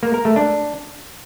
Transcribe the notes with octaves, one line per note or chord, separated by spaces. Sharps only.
A#3
A#4
A3
D4